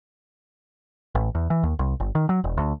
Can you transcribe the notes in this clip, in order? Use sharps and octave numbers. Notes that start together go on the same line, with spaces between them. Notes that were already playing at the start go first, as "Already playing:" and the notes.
A1
E2
E3
D#2
C2
G1
D#3
F#3
E1
D2